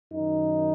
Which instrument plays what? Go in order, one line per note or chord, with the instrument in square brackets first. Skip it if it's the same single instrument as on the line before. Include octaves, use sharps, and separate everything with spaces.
[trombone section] F#2 D#3 D#4